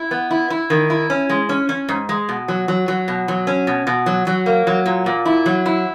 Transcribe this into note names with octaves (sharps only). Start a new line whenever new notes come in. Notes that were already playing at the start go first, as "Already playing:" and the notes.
Already playing: E4
B3
E4
E4
D#3
E4
C#4
G#3
C#4
C#4
G#2
G#3
B2
F#3
F#3
F#3
B2
F#3
C#4
B2
B2
F#3
F#3
A#3
F#3
A#2
A#2
E4
F#3
E4